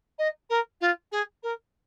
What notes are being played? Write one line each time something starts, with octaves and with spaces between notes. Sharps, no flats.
D#5
A#4
F4
G#4
A#4